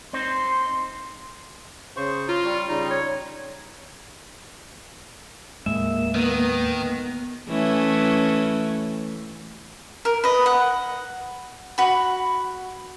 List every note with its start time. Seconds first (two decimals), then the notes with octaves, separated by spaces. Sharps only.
0.13 C4 D#4 C5 C6
1.97 C#3 C5 C#6
2.28 F4 A#5
2.44 G3 C#6
2.69 C#3 G3 D#4
2.90 C#5
5.66 D#2 A2 G#3 A#3 E5
6.15 D#3 B3
7.48 E3 A3 C#4
10.05 A#4
10.24 B4 D#5
10.46 F#5
11.78 F#4 B5